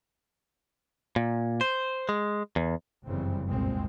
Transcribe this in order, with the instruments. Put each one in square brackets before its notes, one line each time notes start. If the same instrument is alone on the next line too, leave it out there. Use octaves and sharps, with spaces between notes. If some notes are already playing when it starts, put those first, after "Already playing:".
[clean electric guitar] A#2
C5
G#3
E2
[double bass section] G1 F#2 C#3 E3 G3 C4
F1 C2 A#2 G#3 C4